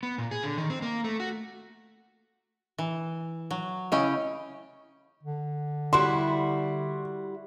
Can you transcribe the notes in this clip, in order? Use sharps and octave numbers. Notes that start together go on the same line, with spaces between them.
B3
A#2
G#4
D3
D#3
C4
A#3
A3
F#4
E3
F#3
C#3 C#4 E4 C#5 D#5 G5
D3
G3 E4 F#4 C6